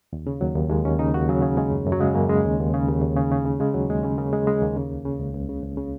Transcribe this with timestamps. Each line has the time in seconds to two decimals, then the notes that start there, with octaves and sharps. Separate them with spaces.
0.13 D#2
0.27 C#3
0.41 D#2 F#3
0.56 D#2
0.70 D#2 G#3
0.85 D#2 C#4
0.99 C#3 D#4
1.14 D#2 F#4
1.29 C#3 F#3
1.42 C#3
1.57 C#3 G#3
1.71 F#2
1.86 F#2
1.92 F#3
2.00 C#3 G#3
2.15 F#2 A#3
2.29 C#3 G#3
2.44 D#2
2.59 D#2
2.74 C#3
2.88 D#2
3.02 D#2
3.16 C#3
3.31 C#3
3.46 C#3
3.60 C#3 G#3
3.74 D#2 F#3
3.90 D#2 G#3
4.03 C#3 C#4
4.18 C#3 A#3
4.33 C#3 G#3
4.47 C#3 G#3
4.62 D#2 A#3
4.76 C#3
4.91 C#2
5.06 C#3
5.20 C#2
5.34 C#2
5.49 C#3
5.63 C#2
5.77 C#3